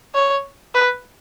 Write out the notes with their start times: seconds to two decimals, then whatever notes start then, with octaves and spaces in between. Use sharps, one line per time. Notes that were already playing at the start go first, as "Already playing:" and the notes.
0.14 C#5
0.75 B4